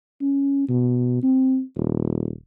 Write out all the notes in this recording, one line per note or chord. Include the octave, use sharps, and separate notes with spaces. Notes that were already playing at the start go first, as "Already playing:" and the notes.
C#4
B2
C4
D#1